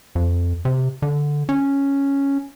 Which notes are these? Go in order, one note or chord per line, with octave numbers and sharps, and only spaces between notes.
F2
C3
D3
C#4